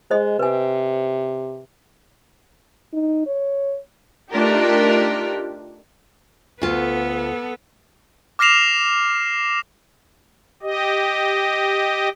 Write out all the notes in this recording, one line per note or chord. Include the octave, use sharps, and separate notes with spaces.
G#3 C5 D#5
C3 B4 G#5
D#4
C#5
A3 D4 D#4 F4 G4 A#4
D2 B3 F4 A4
D6 F6 A#6 C7 E7 F7
G4 D#5